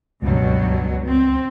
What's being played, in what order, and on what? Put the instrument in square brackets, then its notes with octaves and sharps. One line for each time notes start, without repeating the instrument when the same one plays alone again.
[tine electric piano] C#2 [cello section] G2 B2 F#3
[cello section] C4